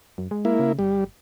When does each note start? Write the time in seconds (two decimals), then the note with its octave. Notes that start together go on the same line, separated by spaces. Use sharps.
0.18 F#2
0.31 G#3
0.45 A#3 E4
0.59 C#3
0.79 G1 G3